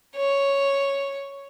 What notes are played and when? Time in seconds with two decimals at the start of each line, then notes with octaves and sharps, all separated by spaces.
0.15 C#5